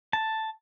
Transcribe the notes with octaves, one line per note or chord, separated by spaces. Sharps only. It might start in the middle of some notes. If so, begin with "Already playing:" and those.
A5